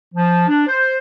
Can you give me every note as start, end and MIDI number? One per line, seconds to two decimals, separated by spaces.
0.14 0.47 53
0.48 0.64 62
0.67 0.97 72